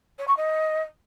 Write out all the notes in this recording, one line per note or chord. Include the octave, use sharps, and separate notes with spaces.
C#5
C#6
D#5